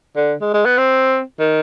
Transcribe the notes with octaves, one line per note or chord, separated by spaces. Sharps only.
D3
G#3
G#3
B3
C4
D#3